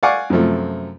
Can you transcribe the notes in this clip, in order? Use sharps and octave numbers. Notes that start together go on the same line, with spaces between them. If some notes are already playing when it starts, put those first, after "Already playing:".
D5 F5 F#5 G#5 C#6 D6
F#2 C3 F3 A3